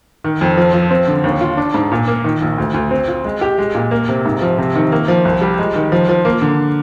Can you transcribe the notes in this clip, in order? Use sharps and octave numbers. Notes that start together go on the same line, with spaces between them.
D#3
F2
F3
F3
C4
D3
D#2
F4
D4
G#2
A#2
A#3
D#3
A#1
D2
D2
C4
F4
G#3
G4
G#3
A#2
A#3
C3
G#2
F3
C3
D#3
A#3
F3
C2
G3
G#3
D#3
F3
F3
A#3
D3